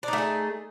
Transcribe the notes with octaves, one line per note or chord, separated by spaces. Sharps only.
A3 D4 D#4 G#4